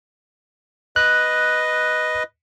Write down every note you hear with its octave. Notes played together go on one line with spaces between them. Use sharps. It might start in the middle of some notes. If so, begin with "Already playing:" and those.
B4 D#5 F#6